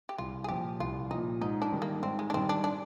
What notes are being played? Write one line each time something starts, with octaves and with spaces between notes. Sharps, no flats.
G4
C2 F4
G#4
A#2 F3 G4
C2 F4
A#2 F3 D#4
G#2 D#4
D4
D#3 G3
A#3
G#2 C4
G#3
D4
D#3 G3 C4
D4
D4